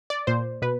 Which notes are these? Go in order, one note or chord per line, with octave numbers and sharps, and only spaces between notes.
D5
A#2 C5
B2 B4